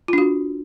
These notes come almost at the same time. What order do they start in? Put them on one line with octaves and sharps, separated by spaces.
F4 D4 F#4